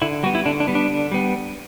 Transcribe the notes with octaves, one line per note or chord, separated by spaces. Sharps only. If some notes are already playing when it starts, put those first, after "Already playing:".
D3 E4
G3 B3 F#4
E4
D3 D4
D4
G3 B3
D4
D3
G3 B3